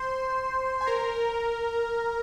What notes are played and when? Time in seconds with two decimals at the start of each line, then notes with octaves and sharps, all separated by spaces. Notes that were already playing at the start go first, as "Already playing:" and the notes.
Already playing: C5 C6
0.81 G#5
0.86 A#4 A#5